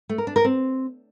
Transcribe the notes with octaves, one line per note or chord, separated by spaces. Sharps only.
A3
A#4
D4
A#4
C4